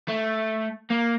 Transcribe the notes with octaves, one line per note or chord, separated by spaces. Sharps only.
A3
A#3